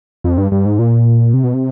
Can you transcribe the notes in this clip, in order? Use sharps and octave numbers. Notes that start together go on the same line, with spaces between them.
F2
G2
G2
G#2
A#2
C3
B2
C3